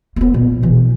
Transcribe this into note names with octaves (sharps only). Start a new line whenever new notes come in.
A#3 B3
A#2
B2 E3